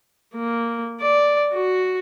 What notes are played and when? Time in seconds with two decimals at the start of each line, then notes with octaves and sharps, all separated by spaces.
0.35 A#3
1.01 D5
1.54 F#4